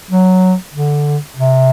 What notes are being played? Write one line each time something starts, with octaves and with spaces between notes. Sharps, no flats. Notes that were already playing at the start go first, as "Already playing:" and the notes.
F#3
D3
C3